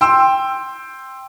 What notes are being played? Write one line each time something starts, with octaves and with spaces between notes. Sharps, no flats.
G5 C6 E6